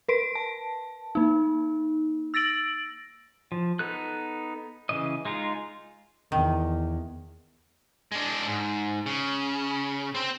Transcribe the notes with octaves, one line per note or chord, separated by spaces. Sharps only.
A#4 B4 D7
A5
A#3 D#4
E6 A6 A#6 D7 F#7
F3
B3 D#4 A4 F#6
C#3 E3 D#5
G#3 D#4 F4
E2 D#3
G#3 D4
G#2
C#3
C4 C5